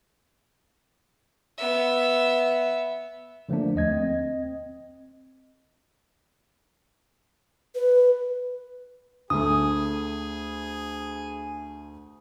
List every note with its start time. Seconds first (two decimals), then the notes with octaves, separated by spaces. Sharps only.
1.58 B3 E5
3.49 D3 F3 A3 A#3 D4
3.75 D#2 A3 D#5 G#6
3.91 C4 D#5
7.75 B4
9.30 D2 A3 G#4 D#6